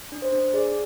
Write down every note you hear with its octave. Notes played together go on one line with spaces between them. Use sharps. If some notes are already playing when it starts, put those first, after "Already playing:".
D4
C5
D4
G#4 D5